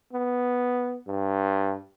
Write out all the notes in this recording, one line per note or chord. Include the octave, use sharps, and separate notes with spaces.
B3
G2